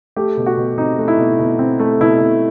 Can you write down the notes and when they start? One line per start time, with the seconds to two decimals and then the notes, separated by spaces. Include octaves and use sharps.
0.16 A3 G4
0.37 B2
0.46 F#4
0.57 B2
0.78 C4 D#4
0.98 A3
1.08 E4
1.18 B2
1.39 B2
1.59 C4
1.80 A3
2.00 B2 E4
2.20 B2